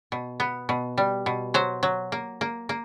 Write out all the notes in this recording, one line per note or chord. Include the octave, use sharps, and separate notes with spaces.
B2
B3
B2
G3
B2
F#3 C5
F#3
A#3
A#3
A#3